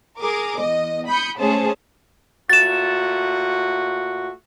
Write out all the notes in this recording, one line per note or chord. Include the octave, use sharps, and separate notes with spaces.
G#4 A#4 D6
E2 D#5
B5 D#6 G6 C#7
A3 C#4 G#4 C5 A5
A#2 A3 F#4 A6 E7